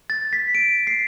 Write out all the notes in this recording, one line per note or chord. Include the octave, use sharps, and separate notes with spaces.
A6
B6
D7
C7